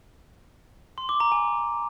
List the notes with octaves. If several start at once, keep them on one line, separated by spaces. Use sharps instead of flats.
C6
D6
A#5
G#5